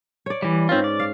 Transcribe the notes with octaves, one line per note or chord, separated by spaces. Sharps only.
C#5 D5
E3 G3
G#2 C4 C#4 F4 B4
D5
F5